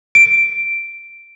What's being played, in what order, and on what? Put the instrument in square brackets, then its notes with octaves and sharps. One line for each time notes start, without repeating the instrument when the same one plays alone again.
[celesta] D7